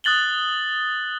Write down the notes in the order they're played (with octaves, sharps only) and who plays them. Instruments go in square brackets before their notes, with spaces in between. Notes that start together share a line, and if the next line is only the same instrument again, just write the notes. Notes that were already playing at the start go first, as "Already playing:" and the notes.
[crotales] D#6 F#6 A6 F#7 G7